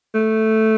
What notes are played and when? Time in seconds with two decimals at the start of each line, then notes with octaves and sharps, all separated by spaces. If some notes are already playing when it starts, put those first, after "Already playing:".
0.14 A3